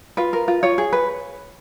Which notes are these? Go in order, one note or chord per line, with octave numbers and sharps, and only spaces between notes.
F4 B4
A#4
F4
F4 C#5
G#4
B4